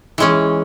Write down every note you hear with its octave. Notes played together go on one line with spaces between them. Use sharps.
E3 G#3 C#4